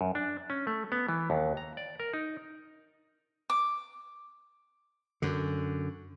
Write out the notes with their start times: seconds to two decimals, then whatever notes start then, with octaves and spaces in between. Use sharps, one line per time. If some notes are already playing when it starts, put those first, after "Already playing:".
0.01 F#2
0.15 D4
0.50 C#4
0.67 A3
0.92 B3
1.09 E3
1.30 D#2
1.57 A#5
1.77 D5
2.00 A#4
2.13 D#4
3.50 D6
5.22 F#2 D3